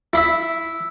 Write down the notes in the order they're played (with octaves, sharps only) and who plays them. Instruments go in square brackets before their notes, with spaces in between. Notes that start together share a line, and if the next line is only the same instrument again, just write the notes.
[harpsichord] E4 E5